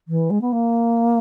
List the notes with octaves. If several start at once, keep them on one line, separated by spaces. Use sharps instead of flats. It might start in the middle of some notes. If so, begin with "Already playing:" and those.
E3
G#3
B3
A#3